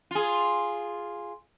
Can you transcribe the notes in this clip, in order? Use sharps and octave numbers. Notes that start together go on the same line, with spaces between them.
F4 G#4